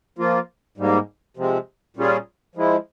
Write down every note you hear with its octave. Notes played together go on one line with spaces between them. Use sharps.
F3 A#3 F4
G#2 G3 A#3
C3 F3 G#3 C4
A#2 G3 C#4 F4 G#4
F3 G#3 E4